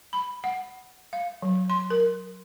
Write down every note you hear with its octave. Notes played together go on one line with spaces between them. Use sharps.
B5
F#5
F5
F#3
C6
A#4